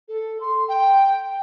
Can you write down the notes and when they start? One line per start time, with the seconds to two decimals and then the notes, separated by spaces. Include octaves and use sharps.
0.08 A4
0.41 C6
0.69 G5